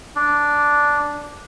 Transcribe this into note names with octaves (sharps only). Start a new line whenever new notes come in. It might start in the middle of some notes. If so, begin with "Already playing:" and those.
D4